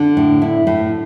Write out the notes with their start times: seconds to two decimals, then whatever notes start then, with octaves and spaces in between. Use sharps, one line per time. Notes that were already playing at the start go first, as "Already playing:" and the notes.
Already playing: D3
0.17 A2
0.42 E4
0.67 A2